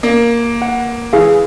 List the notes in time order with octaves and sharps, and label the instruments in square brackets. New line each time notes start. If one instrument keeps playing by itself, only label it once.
[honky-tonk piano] A#3
[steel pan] F#5
[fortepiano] E3 [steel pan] G#4 F5